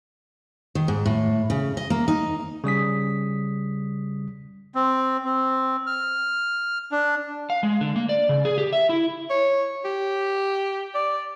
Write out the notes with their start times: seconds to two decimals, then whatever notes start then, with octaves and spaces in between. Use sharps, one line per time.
0.75 D#3
0.88 G#2
1.06 A2
1.50 C#3
1.77 D#5
1.90 A#3
2.08 D#4
2.64 C#3 G3 D#6 B6
4.75 C4
5.25 C4
5.87 F6
6.92 D4
7.50 F5
7.63 G#3
7.81 D3
7.96 A#3
8.09 D5
8.29 C#3
8.45 G#4
8.58 G4
8.73 E5
8.89 E4
9.30 C#5
9.85 G4
10.95 D5